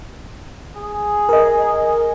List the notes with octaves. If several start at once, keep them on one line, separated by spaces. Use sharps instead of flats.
G#4
A#4 D#5